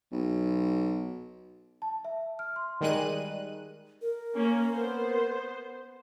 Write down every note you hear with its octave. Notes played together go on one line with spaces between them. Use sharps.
B1
A5
E5
F6
C6
D#3 G3 G#3 F#6 D#7
A#4
A#3 C#4
B3 C5